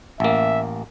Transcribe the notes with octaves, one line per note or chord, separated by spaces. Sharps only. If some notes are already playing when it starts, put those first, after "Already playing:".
A1 A#3 E5